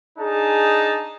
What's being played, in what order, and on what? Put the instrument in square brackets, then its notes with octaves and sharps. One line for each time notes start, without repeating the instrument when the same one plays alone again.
[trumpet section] D4 D#4 A5 [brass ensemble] G#4